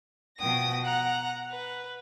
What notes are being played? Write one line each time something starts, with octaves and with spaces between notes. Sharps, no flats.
B2 F3 G5 D#6 A#6
F#5 A#5 F#6
B4